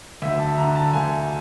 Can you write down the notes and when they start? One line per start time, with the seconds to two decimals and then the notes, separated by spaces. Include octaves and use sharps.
0.22 D2 E5
0.39 A5
0.58 D3 A#5
0.75 A5
0.93 D2 G#5